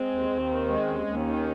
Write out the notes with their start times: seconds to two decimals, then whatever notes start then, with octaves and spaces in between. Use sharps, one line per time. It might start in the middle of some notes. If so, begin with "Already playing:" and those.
Already playing: G#3 C4
0.11 D#2
0.30 D#2
0.50 D#3
0.69 G#3
0.88 D#2 C#4
1.07 D#2
1.27 D#3